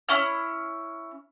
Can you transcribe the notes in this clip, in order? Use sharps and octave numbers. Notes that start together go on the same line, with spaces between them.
C#4 E4 F6